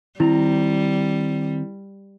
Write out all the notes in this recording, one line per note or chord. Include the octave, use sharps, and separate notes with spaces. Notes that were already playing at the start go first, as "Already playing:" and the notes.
D#3 G3 C4 E4 A#5